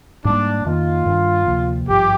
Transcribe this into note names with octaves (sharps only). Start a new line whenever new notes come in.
G#2 G3 A#3 D4
F2 D#3 A#3 F4
G2 D#3 G3 D4
D2 C3 F3 A#3
G#1 G2 F3 G4